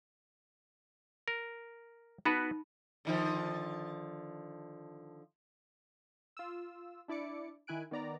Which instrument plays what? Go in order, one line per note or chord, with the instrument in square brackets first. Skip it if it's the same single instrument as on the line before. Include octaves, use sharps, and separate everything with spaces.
[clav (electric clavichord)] A#4
[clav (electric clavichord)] B3 F#4 B4 [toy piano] D#4 B5
[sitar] D3 D#3 F3
[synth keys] F4 E6
D4 E4 D5 D6 C#7
D#3 E4 G#5 F#6 D7
D#3 B3 D5 A#5